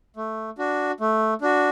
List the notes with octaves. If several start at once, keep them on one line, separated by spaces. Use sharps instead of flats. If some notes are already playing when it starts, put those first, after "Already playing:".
A3
D4 F#4
A3
D4 F#4